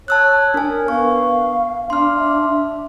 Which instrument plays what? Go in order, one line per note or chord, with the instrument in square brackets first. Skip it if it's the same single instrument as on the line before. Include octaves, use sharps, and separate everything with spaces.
[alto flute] C#5 [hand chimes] A5 E6 F#6
[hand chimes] D4 G#5 [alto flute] A#4
[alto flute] B3 [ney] F5 [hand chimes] C#6
[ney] D4 [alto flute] F5 [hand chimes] C6 F6
[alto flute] E5